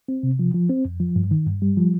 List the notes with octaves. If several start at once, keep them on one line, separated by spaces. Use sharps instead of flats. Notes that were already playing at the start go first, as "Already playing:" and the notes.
C4
C3
F3
F3
C4
F2
F3
G2
D#3
G2
G3
F3